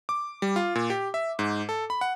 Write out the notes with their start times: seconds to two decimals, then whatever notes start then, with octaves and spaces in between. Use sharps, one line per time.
0.09 D6
0.42 G3
0.56 F4
0.75 A#2
0.90 G4
1.14 E5
1.39 G#2
1.69 A4
1.90 B5
2.01 F#5